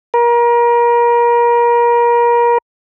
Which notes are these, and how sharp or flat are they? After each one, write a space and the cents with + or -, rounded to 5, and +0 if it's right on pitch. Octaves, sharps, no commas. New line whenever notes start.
A#4 +30